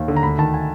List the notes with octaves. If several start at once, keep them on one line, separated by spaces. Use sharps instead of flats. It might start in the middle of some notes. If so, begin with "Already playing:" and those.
Already playing: D#2
D3
A#5
D2 B5
D#3 A5
G#5